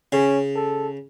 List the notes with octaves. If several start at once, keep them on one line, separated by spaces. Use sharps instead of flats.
C#3 C#4
A4